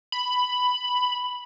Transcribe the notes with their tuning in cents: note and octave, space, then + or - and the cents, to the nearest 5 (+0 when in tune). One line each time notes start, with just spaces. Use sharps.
B5 +5